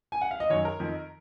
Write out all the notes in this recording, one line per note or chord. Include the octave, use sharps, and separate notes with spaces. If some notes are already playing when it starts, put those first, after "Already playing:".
G#5
F#5
F5
D#5
F#2 D#3 C#5
A#4
F2 D#3